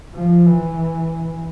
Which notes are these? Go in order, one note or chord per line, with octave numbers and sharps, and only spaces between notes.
F3
E3